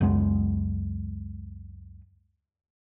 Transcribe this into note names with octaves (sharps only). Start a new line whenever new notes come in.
C#2 F#2 G#3 B3